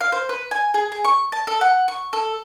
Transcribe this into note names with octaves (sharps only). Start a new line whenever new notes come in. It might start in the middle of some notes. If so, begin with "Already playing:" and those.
F5
C5
B4
G#5
G#4
G#4
C#6
A5
A4
F#5
C#6
A4